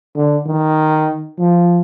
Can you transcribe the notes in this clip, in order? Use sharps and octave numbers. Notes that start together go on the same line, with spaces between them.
D3
D#3
F3